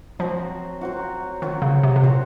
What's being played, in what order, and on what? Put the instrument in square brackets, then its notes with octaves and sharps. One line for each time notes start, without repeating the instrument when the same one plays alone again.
[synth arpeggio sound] F3 [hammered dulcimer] F#3 C4 F#4
[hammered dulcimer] F#3 C4 F#4
[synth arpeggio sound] D#3 [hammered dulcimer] F#3 C4 F#4
[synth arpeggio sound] C#3
C3
C3
[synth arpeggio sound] A#2 [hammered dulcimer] F#3 C4 F#4